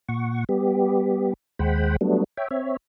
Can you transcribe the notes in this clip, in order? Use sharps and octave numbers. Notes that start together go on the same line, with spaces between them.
A#2 F#5 C#6
G3 B3 G4
D#2 G#3 C5 F#5 G5 B5
F#3 G3 A3 B3 D4
C#5 E5 G5
C4 C#5 E5